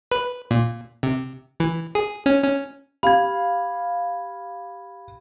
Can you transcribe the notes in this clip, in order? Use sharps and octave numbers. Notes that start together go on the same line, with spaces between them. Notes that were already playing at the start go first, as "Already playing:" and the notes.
B4
A#2
C3
E3
G#4
C#4
C#4
G4 F5 B5 G#6